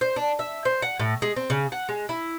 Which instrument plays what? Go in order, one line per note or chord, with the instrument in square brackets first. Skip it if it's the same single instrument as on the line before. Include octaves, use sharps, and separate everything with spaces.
[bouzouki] C5
D4
E5
C5
F#5
A2
G#3
C4
C#3
F#5
G#3
E4